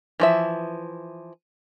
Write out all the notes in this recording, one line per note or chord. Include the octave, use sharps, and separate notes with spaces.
E3 F3 E5